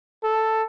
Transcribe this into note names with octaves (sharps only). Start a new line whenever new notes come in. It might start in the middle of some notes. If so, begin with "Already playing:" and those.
A4